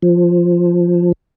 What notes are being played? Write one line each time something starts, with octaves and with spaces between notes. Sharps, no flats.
F3